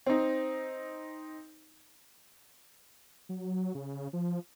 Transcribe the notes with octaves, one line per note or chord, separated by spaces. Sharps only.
C4 D#4
F#3
C#3
F3